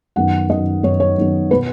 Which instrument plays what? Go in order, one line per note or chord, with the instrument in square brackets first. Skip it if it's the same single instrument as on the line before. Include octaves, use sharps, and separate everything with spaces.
[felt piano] F#2 D#3 B3 F#5
F#2 D#3 B3 D#5
F#2 D#3 B3 C#5
C#5
F#2 D#3 B3
B2 B3 B4